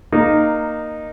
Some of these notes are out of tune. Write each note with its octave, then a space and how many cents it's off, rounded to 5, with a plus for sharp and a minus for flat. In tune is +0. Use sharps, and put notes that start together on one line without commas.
A#3 +0 D#4 -15